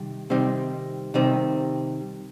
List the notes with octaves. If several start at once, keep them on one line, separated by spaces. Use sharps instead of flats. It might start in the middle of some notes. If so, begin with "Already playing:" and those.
Already playing: C3 D#3 G3
C3 D#3 G3 C4 D#4
C3 D#3 G3 C4 D#4